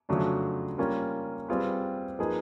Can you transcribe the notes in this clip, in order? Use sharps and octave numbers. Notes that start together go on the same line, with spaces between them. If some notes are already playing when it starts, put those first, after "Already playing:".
F2 C#3 F#3 A3 D4
G3 A#3 C#4 F4
G3 C4 F4 G#4 B4
F3 A#3 D#4 G#4 B4